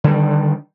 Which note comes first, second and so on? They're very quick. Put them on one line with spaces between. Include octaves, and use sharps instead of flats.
D3 G3 D#3